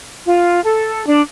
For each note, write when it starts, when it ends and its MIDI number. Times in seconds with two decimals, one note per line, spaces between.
0.25 0.60 65
0.64 1.04 69
1.06 1.21 62